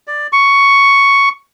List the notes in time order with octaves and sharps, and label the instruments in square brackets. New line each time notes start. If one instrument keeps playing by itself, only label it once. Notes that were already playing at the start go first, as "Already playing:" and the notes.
[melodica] D5
C#6